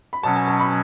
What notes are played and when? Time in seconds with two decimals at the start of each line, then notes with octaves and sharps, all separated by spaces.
0.13 B5
0.23 B2 F#3 C#4 A5
0.36 G#5
0.48 A5
0.60 B5